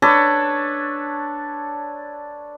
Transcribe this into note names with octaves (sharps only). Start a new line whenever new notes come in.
D4 A4 B4 C#5